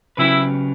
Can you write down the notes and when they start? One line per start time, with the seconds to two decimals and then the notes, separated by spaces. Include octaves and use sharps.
0.17 C#3 F#3 C#4 E4 G4 B4